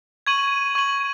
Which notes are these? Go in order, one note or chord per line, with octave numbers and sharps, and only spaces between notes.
C#6 G#6 D#7 F#7
C#6 G#6 D#7 F#7